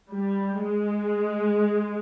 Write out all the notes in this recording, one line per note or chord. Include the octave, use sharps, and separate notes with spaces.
G3
G#3